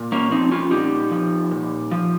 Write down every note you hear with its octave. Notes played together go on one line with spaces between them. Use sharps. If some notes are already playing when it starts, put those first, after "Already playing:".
Already playing: A#2
A#3 C#4
F3 C4 D#4
C#4 F4
A#2 D#4 G4
F3
A#2
F3